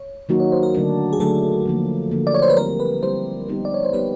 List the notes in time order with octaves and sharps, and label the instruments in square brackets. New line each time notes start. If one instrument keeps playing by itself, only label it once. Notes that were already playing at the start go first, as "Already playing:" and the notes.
Already playing: [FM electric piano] C#5
[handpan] D#3 F#3 A#3 D#4 F#4
[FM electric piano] C#5
C5
A#4
[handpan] D3 F#3 A3 D4
[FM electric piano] G#4
[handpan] D3 F#3 A3 D4 [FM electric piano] A4
[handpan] D3 F3 A#3
D3 F3 A#3
[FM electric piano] D5
C#5
C5
B4
[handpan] G3 C4 E4 G4 [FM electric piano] A#4
[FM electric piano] B4
[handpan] G3 C4 E4 G4 [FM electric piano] C5
[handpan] G3 B3 D#4 G4
[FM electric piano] D5
C#5
C5
[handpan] G3 B3 D#4 G4 [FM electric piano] B4